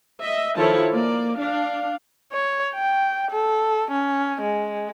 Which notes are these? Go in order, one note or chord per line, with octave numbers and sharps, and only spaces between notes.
D#5 E5
D#3 F3 E4 A4 C#5 A5
A#3 D5
D4 F5
C#5
G5
A4
C#4
G#3